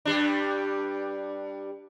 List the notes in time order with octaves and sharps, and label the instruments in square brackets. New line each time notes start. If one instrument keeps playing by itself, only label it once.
[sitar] G2 G3 D4